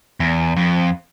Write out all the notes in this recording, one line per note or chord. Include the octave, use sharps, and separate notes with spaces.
E2
F2